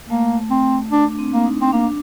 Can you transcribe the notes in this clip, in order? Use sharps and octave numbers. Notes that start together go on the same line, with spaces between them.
A3 A#3
C4
D4
D4
C4
A#3
D#4
C4
A#3 D4